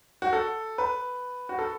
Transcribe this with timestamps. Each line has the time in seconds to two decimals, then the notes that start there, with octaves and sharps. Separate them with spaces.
0.22 F#4
0.33 A4
0.78 B4
1.49 F#4
1.59 A4